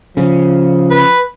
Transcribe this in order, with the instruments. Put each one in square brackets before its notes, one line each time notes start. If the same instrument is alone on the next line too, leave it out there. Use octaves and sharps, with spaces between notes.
[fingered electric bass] C#3 [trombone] F3
[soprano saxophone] B4